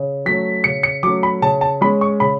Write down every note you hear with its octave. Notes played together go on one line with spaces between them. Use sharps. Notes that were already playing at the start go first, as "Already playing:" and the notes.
Already playing: C#3
F#3 A3 C#4 B6
C#3 C#7
C#7
F#3 A3 C#4 D6
B5
C#3 A5
A5
G#3 C#4 B5
C#6
C#3 B5